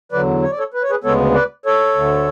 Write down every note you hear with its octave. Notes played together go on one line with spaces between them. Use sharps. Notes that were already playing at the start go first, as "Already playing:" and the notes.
E2 D3 F#3 B4 D5
C#5
D5
A4 C#5
B4
C#5
G#4 B4
D2 C#3 G#3 B3 A4 C#5
B4 D5
A4 C#5
D2 D3 A3